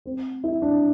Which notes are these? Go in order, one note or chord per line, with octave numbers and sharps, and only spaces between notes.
C4
E4
D4